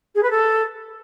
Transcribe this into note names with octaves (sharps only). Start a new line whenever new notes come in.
G#4
B4
A4